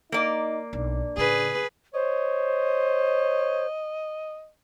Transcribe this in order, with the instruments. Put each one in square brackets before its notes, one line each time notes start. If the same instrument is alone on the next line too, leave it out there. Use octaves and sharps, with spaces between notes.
[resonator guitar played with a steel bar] A#3 D5 [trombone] D#4
[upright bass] B1 [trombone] D4
[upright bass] A2 C#3 [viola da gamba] G#4 B4
[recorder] C5 [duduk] C#5 [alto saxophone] D#5